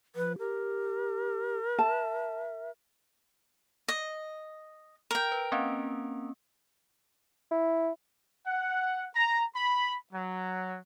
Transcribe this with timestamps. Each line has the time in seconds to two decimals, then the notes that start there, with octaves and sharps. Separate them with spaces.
0.16 F3 B4
0.39 G4 A#4
1.79 E5 A5
3.88 D#5
5.11 A#4 G5
5.32 B4
5.52 A#3 C4 C#4
7.51 E4
8.47 F#5
9.14 A#5
9.55 B5
10.13 F#3